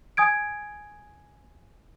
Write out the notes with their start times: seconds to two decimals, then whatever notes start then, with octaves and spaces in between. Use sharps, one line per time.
0.17 G#5 D#6 G#6 D7